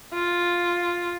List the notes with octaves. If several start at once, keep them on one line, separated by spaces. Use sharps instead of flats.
F4